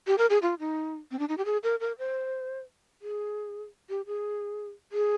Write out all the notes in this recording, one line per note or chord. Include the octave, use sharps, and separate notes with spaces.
G4
A#4
G#4
F4
D#4
C4
D4
D#4
G4
G#4
A#4
A#4
C5
G#4
G4
G#4
G#4